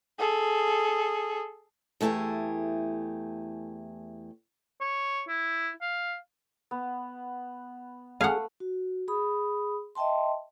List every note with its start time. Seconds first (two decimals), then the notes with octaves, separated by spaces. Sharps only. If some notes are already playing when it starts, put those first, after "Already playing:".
0.19 G#4 A4
2.01 E2 A3 E4 G4 G#4
4.81 C#5
5.28 E4
5.82 F5
6.71 B3
8.21 A3 G#4 F5 F#5
8.60 F#4
9.08 G#4 B5 D#6
9.95 D#5 E5 G5 A5 C6